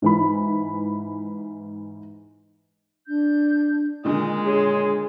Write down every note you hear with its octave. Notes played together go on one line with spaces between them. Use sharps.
G#2 E3 B5
D4 G6
A#2 D3 D#3 G#3 D#6
G#4 C#5 C6